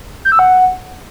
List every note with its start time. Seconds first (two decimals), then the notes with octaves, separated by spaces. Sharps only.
0.25 G6
0.32 E6
0.39 F#5